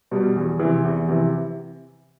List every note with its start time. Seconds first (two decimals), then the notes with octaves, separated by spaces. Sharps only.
0.11 B2 G3
0.36 E2
0.59 C3 E3
0.85 E2
1.08 C3 E3